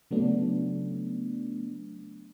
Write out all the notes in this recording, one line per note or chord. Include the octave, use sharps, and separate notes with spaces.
C#3 F#3 A3 B3 D4